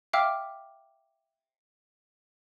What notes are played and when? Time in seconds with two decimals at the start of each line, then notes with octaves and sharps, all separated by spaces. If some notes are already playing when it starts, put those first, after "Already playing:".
0.13 E5 F5 G5 D6 E6 F6